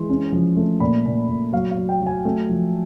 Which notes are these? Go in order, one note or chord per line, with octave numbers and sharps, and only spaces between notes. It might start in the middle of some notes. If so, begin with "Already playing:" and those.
Already playing: E3 G#3 C6
C#4
F3
A3
A#2 B5
A#2
A#2
F#3 F5
F5
F#3
G5
F#3
G#5
A3
F3